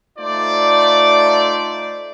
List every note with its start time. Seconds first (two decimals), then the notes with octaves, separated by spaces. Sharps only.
0.19 A3 D#4 F4 C5 D5